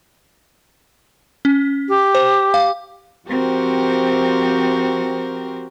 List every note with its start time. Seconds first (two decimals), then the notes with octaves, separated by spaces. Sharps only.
1.45 C#4
1.89 G4
2.15 C5
2.54 F5
3.27 F3 C4 F#4 G4 A#4 C5